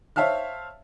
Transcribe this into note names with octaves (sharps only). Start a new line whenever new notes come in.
C5 C#5 E5 F5 A5 F6